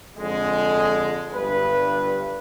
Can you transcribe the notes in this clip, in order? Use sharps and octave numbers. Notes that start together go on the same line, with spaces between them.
F2 D3 G#3
G1 G2 B4